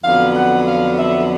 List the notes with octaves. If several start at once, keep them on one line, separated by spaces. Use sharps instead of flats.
F2 D3 F#3 B3 F5
F#5
F5
E5